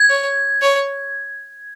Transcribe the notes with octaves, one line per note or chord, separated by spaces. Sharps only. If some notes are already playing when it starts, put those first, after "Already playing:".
Already playing: G#6
C#5
C#5